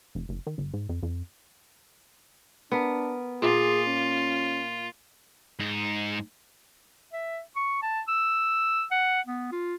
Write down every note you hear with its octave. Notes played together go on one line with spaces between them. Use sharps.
F1
F#1
D#3
G1
G#2
F2
F2
B3 D4 A#4
A#2 F4 G#4
C#4
G#2 D#4
E5
C#6
A5
E6
F#5
B3
F4